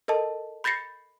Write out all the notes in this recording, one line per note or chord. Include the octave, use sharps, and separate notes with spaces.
A4 A#4 D#5 A5
B5 G6 A6 A#6 C7 C#7